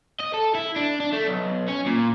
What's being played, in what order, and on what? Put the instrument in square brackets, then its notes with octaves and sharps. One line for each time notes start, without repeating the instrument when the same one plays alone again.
[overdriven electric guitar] D#5
A4
E4
D4
D4
A3
B1
C#4
A#2